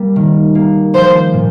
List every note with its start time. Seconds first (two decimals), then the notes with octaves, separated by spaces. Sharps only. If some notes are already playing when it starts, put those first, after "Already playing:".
Already playing: G3 A#3
0.16 D#3
0.55 A#3
0.94 F3 C5
1.34 A#2